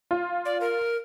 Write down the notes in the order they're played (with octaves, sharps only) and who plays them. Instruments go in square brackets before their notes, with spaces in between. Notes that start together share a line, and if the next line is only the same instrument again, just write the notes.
[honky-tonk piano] F4
[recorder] D5
A#4